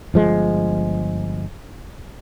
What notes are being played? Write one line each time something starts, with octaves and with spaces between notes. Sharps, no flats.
G1 F3 G#3